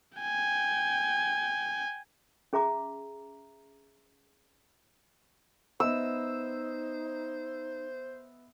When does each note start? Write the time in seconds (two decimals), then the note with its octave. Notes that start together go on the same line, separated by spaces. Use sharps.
0.19 G5 G#5
2.53 C#4 G#4 E5 A#5 D6
5.80 B3 D#4 C5 D#5 E5 E6